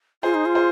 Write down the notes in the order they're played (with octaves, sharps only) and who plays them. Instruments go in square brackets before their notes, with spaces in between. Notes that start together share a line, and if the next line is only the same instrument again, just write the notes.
[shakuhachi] F4 [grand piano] G#4 C5
[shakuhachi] D#4
F4
[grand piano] G#4 C5